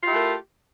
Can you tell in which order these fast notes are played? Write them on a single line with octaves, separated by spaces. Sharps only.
F4 G4 E4 A3 A#4